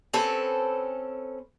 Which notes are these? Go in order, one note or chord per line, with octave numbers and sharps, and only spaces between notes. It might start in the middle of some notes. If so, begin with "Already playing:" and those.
C4 C#4 A4 B4